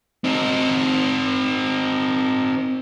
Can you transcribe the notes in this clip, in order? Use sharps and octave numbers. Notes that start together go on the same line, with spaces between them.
C4 D#4